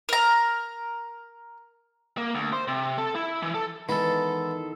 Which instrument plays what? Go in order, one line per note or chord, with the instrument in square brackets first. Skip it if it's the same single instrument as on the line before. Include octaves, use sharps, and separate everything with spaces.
[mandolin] A#4 A#5
[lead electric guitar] A#3
D2
C5
C3
A4
E4
E3
A4
[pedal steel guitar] D#3 A4 [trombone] E3 [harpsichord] G#3 B3